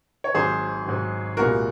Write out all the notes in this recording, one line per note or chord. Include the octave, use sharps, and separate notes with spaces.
C#5
G#1 G#2 F#3 G#4 C5
G#1 G#2 F#3
C2 A#2 G#3 F#4 A#4